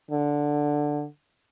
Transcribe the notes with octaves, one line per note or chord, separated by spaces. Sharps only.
D3